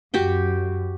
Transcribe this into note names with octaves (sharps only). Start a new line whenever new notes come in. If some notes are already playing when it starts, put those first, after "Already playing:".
F#2 F#4 G4 G5